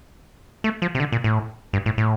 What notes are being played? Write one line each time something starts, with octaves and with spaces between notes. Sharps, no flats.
A3
F3
C3
D3
A#2
A2
G2
A2
A2